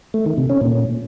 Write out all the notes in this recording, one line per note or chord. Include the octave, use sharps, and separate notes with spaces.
A3
D#3
C3
C#4
A#2